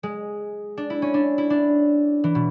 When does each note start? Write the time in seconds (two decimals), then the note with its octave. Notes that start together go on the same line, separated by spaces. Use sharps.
0.03 G#3
0.77 D4
0.90 E4
1.02 C#4
1.14 D4
1.38 E4
1.50 D4
2.24 E3
2.35 B2